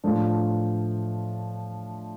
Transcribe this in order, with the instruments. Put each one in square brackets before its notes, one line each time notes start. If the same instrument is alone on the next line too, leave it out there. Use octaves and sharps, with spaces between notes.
[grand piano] A2 F3 A3 D4